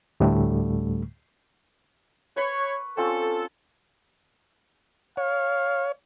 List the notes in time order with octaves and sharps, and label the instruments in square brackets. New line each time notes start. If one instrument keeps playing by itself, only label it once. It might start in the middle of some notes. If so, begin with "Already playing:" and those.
[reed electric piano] D2 A2 D3 G3 A3
[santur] B4 B5 C#6 [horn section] C#5
[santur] C4 C#4 F4 [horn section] A4
[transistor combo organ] C#5 [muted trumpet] F5